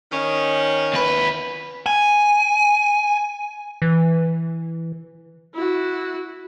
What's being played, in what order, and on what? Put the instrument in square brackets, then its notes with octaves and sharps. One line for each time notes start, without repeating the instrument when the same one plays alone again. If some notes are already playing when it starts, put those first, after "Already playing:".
[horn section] D#3 C#4
[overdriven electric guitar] D#2 B4
[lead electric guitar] G#5
[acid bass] E3
[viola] E4 F#4